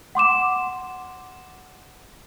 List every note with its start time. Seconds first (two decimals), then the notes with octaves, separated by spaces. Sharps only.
0.15 F#5 C6 D6 E7